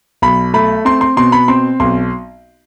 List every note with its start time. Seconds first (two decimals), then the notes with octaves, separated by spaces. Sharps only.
0.22 B1 B5
0.54 A3 B5
0.85 C4 C6
1.01 C6
1.17 B2 C6
1.32 B5
1.48 C4 C6
1.80 B1 C6